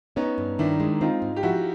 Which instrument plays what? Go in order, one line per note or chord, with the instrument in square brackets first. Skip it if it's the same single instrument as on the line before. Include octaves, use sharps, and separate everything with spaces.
[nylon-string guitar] B3 [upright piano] C#4 D#4
[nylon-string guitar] G2
[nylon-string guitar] D#3 [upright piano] D4 E4
[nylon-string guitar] G#3
[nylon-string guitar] C4 [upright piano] D#4 F4
[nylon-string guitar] G#2
[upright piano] G4
[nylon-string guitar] F3 [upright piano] E4 F#4